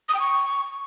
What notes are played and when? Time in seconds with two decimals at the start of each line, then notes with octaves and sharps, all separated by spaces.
0.09 D#6
0.14 G5
0.20 C#6